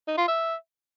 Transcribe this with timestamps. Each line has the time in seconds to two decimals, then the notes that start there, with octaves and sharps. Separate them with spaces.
0.08 D#4
0.18 F4
0.28 E5